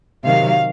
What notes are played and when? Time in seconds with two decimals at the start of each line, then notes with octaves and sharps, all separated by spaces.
0.25 C3 D#3 F#3 F5